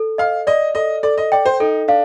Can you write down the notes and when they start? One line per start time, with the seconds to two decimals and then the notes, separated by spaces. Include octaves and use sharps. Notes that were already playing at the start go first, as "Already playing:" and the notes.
Already playing: A4
0.18 D#5 F5
0.47 D5 D#5
0.75 A4 D#5
1.03 A4 D5
1.18 D#5
1.32 D5 G5
1.46 C5
1.60 D#4 A4
1.88 D4 F5